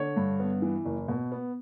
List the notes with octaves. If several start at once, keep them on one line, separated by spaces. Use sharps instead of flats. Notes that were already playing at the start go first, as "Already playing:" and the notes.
Already playing: D3 C#5
G2
B3
E3
F#1
B2
B3